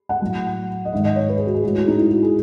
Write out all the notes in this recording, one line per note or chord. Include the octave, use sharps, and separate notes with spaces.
F#5
A2 F#3
D#5
G#2 D#3 G#3 E5
D#5
C#5
B4
G#4
F#4
G#4
A2 G#3 F#4
E4
D#4
E4
F#4
G#4